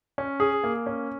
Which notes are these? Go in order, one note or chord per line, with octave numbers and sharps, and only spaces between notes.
C#4
G#4
A#3
C#4